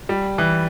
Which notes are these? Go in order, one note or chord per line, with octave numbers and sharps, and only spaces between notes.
G3
E3